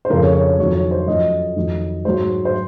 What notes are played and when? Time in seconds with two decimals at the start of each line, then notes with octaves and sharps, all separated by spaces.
0.05 C5
0.10 F2 C#3 F3 A#4
0.22 C#5
0.34 C#5
0.47 C#5
0.59 F2 D#3 F#3 C#5
0.75 C#5
0.91 C5
1.07 F#2 F3 D#5
1.56 F2 D#3 F#3
2.05 G#2 F#3 C5
2.45 C5